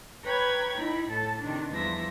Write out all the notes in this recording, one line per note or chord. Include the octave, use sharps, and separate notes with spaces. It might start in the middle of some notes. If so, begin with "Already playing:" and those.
B4 C#5 G5 A#5 B5 G#6
D#4 E4 B5
A2 A4 A5
C3 D#3 D4
E2 F3 G3 E5 A#6